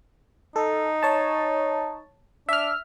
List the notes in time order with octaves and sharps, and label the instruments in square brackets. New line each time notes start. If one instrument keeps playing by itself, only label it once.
[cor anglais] D#4 [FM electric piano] A4
[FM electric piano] C#5 A5
[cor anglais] D4 [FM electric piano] E5 F6